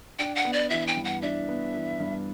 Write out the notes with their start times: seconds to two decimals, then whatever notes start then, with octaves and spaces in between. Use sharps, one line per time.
0.19 D4 G5
0.35 F#5
0.45 B3
0.53 D5
0.70 E3 E5
0.87 G5
0.97 G2
1.05 F#5
1.22 D4 E5
1.48 B3
1.74 E3
2.00 G2